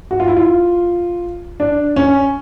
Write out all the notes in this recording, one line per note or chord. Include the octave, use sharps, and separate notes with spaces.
F#4
F4
E4
F4
D4
C#4